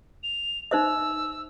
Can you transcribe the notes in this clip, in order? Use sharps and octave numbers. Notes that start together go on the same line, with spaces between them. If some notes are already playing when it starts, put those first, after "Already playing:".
F7
D#4 C5 E5 E6